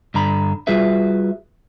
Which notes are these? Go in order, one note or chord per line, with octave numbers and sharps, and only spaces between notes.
G2 D3 A#5 B5
G3 F4 F#4 G#4 B4 E5